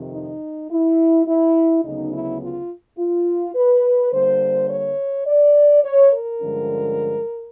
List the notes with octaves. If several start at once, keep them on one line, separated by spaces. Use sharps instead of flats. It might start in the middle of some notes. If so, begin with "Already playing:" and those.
Already playing: F2 C3 D#3
D#4
E4
E4
D2 C#3 F#3 B3 D#4
E4
F4
F4
B4
D3 G3 A#3 C5
C#5
D5
C#5
A#4
G2 D3 F3 G#3 C#4